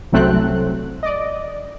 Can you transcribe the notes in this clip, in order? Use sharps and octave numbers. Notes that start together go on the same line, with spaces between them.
C2 F#3 A3 C4 F#6
D5 D#5